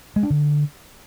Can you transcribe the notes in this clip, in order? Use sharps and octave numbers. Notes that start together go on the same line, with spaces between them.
G#3
D4
D3